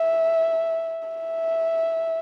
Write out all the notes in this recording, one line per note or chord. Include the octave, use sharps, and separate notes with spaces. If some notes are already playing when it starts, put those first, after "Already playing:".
Already playing: E5
E5